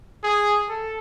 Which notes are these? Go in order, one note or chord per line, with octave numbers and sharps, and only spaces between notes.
G#4
A4